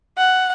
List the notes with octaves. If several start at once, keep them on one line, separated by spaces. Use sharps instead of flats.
F#5